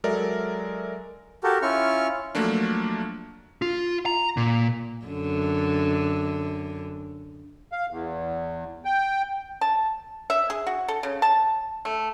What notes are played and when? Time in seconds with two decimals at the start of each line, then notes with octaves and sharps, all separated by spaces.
0.04 F#3 G#3 A4 A#4 D5 E5
1.44 F#4 G4 A4 A#4
1.62 C#4 E4 F4 C#6 F6
2.35 F3 F#3 A3 A#3 D4
3.62 F4
4.06 A#5
4.37 A#2
5.05 F#2 D3
7.72 F5
7.91 E2
8.85 G5
9.61 A5
10.30 E5
10.50 G#4
10.67 F#4
10.88 A4
11.03 C#3
11.22 A5
11.85 A3